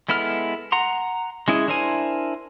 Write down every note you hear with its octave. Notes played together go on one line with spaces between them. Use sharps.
G#3 B3 E4 A4 F6
F#5 A#5 C6
G#3 C#4 E4 G#4
D4 E4 A#4 C5 G#5